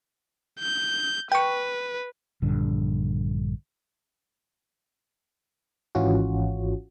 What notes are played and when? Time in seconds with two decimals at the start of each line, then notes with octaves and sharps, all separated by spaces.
0.60 G6
1.32 B4 G5 C#6
2.42 A#1 G2 D3
5.95 G#1 G#2 E3 C#4 F4 F#4